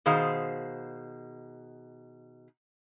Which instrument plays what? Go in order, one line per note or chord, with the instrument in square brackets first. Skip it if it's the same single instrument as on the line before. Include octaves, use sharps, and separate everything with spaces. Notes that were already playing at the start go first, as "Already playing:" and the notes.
[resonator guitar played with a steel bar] B2 D#3 G#4 C5 F5